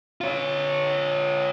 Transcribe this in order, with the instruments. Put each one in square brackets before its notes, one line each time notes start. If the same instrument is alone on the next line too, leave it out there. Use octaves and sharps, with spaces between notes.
[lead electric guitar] F4 C#5